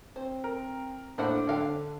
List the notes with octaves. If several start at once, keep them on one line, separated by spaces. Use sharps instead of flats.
C4 C5
A#4
A2 A#3 D4 C5 F#5
D3 A4 F5 G5